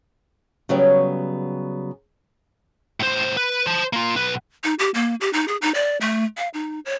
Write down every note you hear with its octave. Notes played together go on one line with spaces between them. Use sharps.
C#3 F#3 G3 B3 C#5 G5
A2 C5
B4
C5 A5
A#3 F4
B1 B4
D#4
G4
A#3
G4
D#4
G#4
D#4
D5
A3
F5
D#4
C#5